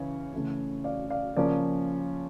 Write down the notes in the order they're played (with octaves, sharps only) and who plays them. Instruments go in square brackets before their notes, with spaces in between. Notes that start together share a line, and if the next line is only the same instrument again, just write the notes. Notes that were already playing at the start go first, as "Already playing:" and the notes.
Already playing: [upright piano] C#3 E3 C#4 C#5
C#3 E3 A3 C#4
D5 F5
D5 F5
C#3 F3 A#3 C#4 A#4 D5